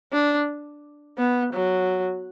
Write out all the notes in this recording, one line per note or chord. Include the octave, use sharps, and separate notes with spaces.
D4
B3
F#3